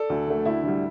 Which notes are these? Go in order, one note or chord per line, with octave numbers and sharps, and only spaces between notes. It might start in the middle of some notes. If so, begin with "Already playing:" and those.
Already playing: A4 D5
D2
D3 A3
D2 E4
D3 G3